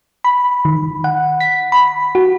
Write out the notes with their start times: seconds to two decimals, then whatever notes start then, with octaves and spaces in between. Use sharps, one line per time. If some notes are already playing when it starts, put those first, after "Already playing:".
0.24 B5
0.65 D#3
1.04 F#5
1.40 B6
1.72 B5
2.15 F#4